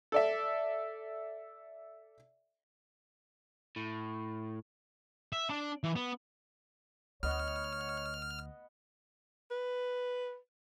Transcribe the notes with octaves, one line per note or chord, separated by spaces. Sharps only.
A4 D5 E5
A2
E5
D4
E3
B3
D2 B3 C#5 D#5 F#5 F6
B4